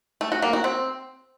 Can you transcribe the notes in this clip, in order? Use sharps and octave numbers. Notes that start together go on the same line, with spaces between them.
A3
F#4
A#3
F#4
C4